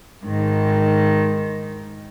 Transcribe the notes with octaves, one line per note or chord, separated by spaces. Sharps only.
G#2 D#3